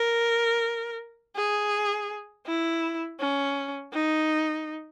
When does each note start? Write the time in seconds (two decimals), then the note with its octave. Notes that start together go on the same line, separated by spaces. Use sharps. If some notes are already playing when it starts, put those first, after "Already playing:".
Already playing: A#4
1.36 G#4
2.46 E4
3.20 C#4
3.93 D#4